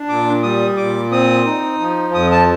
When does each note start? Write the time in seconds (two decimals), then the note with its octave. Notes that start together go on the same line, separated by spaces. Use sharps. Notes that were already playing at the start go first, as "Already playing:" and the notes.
Already playing: D4
0.09 A#2 D6
0.43 G3 D#6
0.77 A#2 D6
1.11 C4 D#6
1.45 D#4
1.80 F3
2.13 F2 D#6
2.31 A5